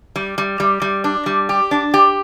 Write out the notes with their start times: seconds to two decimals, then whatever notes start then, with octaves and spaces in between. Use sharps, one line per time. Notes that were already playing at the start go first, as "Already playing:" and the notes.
0.16 G3
0.38 G3
0.60 G3
0.82 G3
1.04 D4
1.26 G3
1.49 G4
1.71 D4
1.94 G4